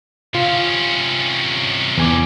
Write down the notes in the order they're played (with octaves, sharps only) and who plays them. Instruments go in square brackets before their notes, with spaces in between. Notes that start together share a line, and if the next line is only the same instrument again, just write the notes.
[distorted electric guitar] C3 C#4 [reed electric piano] F4
[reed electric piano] E2 G#5 D6